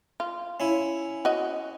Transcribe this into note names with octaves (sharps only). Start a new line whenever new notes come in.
F4
C#4 E4
F#4 D#5